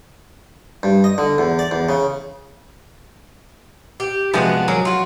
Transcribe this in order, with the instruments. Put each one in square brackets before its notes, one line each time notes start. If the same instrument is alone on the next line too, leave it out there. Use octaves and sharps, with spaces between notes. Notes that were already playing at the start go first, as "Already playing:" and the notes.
[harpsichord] G2
D#5
D3
E2
D5
E2
C#3
[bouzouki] G4
[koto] C3 F3 G#3 [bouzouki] B3 D4 F#4
[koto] F#3 [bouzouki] A#3 G#4
[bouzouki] F4 F#4